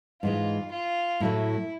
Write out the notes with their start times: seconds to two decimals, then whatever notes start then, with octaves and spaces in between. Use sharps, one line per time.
0.22 G#2 E3 G#3 F4
0.71 F4
1.20 A2 F#3 A3 E4